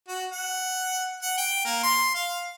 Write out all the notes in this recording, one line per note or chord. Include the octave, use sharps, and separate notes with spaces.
F#4
F#5
F#5
G5
A#3
C6
F5